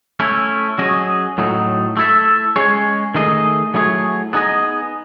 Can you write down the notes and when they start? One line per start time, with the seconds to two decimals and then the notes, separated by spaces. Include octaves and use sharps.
0.20 A3 C#4 E4
0.78 F#3 C#4 G#4 D#5
1.38 A2 F#3 A3 D#4
1.97 A3 E4 A4 E5
2.56 G#3 C#4 G#4 C#5
3.15 D#3 A3 D#4 G#4 D#5
3.74 F#3 A3 E4 G#4 C#5
4.33 B3 D#4 G#4 D#5